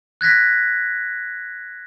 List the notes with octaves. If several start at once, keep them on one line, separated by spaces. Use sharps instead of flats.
F#6 G#6 A#6 B6